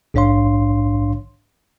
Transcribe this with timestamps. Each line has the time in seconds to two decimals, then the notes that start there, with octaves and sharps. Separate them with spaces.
0.14 A#1 G#2 D4 C#5 F5 C6